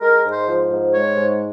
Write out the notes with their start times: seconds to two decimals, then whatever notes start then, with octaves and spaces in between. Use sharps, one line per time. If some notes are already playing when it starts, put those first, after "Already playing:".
0.01 G#3 A#4
0.24 G#2
0.32 C5
0.46 F3
0.69 G#2
0.92 G#3 C#5
1.15 G#2